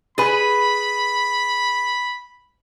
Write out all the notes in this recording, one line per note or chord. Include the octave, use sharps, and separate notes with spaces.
G#4 B4 B5